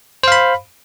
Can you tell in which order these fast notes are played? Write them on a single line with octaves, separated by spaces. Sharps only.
C5 F5 B5